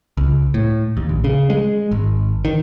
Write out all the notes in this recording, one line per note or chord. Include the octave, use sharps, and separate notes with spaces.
C#2
A2
D#2
A#1
C#3
G#3
G#1
D#3